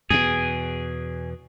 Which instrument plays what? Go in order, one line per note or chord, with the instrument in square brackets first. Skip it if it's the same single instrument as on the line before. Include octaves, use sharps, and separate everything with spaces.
[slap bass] E2 B2 [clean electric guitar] G#4